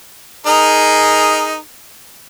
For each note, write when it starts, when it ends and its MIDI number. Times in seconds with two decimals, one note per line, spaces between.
0.46 1.57 63
0.46 1.57 68
0.46 1.57 70